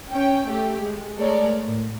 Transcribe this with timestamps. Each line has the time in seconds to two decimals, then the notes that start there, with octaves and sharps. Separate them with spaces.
0.11 C#4 G5
0.49 A3 G4
0.81 G#3
1.18 G#3 A3 A4 A#4 C#5 D5
1.62 A2